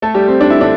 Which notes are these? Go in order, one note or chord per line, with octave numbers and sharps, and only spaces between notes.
A3 A4
G3 G4
C4
D4
E4
D3 D4